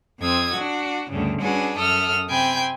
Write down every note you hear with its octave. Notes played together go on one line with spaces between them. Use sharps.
F2 C4 D#6 E6 G#6
D4 F#4
D2 G2 C#3
C#4 D4 F#4 G#4 B4
F#2 A4 E5 D#6 F6
C3 C4 G5 G#5 B5 G6